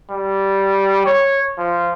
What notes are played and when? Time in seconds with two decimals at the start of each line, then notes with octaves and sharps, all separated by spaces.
0.11 G3
1.06 C#5
1.58 F3